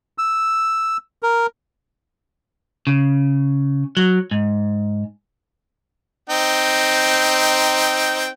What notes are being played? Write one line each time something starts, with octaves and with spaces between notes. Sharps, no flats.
E6
A#4
C#3
F#3
G#2
C4 D#4 G5